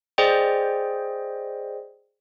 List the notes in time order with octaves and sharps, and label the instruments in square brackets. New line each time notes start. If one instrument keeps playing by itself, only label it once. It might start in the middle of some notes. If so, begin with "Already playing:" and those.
[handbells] G#4 C5 D5 D#5 G5